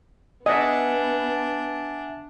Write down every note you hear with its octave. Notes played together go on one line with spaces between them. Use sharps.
B3 D4 D#5 E5 F#5 G#5